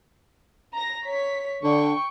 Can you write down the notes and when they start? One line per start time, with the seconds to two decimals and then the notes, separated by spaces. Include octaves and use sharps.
0.73 A#5 A#6
1.06 C#5 B6
1.64 D3 G5 C#6